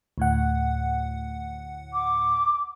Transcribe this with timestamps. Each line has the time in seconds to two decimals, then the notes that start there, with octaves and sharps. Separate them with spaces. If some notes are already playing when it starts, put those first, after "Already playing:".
0.18 D2 A2 F#5
1.93 D6